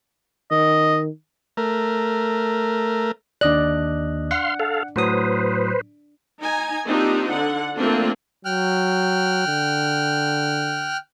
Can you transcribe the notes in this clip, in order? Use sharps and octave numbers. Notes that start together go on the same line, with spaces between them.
D#3 D#5
A3 A#4
D#2 D4 D5 D#5 F#6
F5 F#5 C6
A4 F5
A2 F#3 B4 C5 D#6
D#4 G#5 A#5
A#3 C4 D4 D#4 F4 G4
D3 F#5
F3 A3 A#3 C4 D4 F4
F#3 G5 F6 F#6
D3